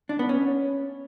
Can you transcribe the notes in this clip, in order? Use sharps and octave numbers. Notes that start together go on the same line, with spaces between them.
D4
B3
C#4